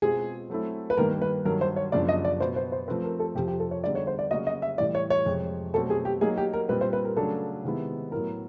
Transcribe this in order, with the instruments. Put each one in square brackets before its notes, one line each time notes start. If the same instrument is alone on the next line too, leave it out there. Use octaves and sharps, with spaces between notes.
[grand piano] B2 G#3 C4 F4 [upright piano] G#4
[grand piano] F#3 A3 C4 E4 A4
[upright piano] B4
[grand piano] G2 D#3 G3 A#3 [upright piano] A#4
[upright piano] B4
[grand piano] G2 D#3 F#3 [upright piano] A#4
[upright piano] C5
C#5
[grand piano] F#2 C#3 F3 A#3 D4 [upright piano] D5
[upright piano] D#5
D5
[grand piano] B2 F#3 B3 [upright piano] C5
[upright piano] C5
C5
[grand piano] F3 A3 C4 [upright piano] B4
[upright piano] A#4
A4
[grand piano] F2 C3 F3 [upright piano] G4
[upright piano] G4
A4
C#5
[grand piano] D3 G3 B3 D#4 G#4 [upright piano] D5
[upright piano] C#5
C5
D5
[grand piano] C#3 F#3 A#3 C#4 F#4 [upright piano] D#5
[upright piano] D#5
E5
[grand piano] A2 E3 G3 [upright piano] D5
[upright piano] C#5
C#5
[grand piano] F2 C3 F3 G#3
[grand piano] B2 F#3 A3 C4 [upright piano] A4
[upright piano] G#4
G4
[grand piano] F#3 A#3 D#4 [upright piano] G#4
[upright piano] G4
A#4
[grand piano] A#2 G3 C4 [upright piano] B4
[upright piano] C5
B4
A#4
[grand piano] C#3 F#3 A3 D4 [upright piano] A4
[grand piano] C3 D#3 G#3 B3 E4
[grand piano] A2 F#3 B3 E4 [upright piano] A#4